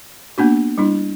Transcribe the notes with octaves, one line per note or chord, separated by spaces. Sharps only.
A#3 B3 D4 F#4
G3 D4 E4